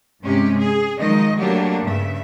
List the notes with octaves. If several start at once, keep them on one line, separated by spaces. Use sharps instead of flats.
G2 C3 G#3 C#4 G4
G#4
D#3 F3 F#3 G#3 D#5
F#3 G3 A3 A#3 D4 G4
G2 C#3 E5